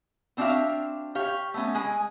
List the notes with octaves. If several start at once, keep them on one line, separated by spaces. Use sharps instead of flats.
B3 C4 D4 F#4 E5 F5
G4 C#5 F5
A3 B3 C#4
G#3 G#4